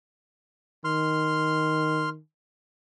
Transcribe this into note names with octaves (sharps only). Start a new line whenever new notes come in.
D#3 C6 F6